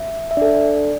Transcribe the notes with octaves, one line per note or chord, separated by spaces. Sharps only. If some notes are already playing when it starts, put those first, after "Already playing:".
Already playing: E5
E5
D4 A4 D5